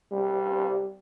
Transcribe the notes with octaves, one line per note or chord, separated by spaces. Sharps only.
G3